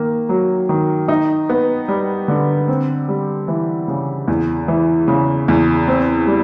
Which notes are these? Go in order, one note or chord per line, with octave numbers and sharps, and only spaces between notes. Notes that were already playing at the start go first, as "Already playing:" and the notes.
Already playing: D#3 A#3
F#3
D#3
D#4
B3
G3
D3
C4
G3
E3
C#3
E2
E3
C#3
E2
C4
G3